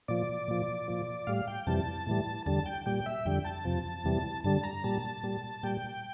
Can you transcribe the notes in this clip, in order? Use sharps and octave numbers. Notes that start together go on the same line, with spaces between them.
A#2 F3 D5
A#2 F3
A#2 F3
A2 G3 F5
G5
F2 C3 E3 G3 A5
A2 E3 G3
E2 D3 G3 A5
G5
A#2 G3 G5
E5
F2 D3 G3 G5
A5
F2 C3 F3
E2 C3 E3 G3
G2 D3 G3 A5
A#5
A#2 G3 A5
A#2 G3
A#2 G3 G5